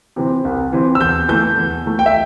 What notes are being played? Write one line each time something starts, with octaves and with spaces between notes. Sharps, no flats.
C3 E3 C4
C2
C3 E3 C4
E6
E2 G6
E3 A3 G6
E2
E3 A3
G5
E5